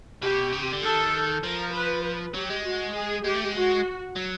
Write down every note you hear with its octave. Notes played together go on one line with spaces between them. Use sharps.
B2 G4
C#3
C3
D3
D#3 A4
F3 A#4
B4
B4
F#3 G4
G#3
F#4
G#4
G#3 G4
A3
G#3
F#4
F#3